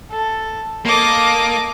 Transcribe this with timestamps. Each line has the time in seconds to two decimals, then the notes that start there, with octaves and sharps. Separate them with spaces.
0.11 A4
0.86 A#3 A4 D#5 D6